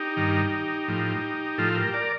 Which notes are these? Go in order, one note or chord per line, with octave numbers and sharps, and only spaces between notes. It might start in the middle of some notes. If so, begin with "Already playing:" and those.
Already playing: D#4 G4
G2 D#3
A2 F3
A2 F3 F4 A4
G4 A#4
A#4 D5